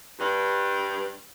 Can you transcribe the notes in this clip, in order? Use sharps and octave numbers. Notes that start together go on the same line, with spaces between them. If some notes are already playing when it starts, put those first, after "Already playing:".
G2